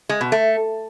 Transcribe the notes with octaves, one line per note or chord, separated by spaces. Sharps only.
G#3
B2
A3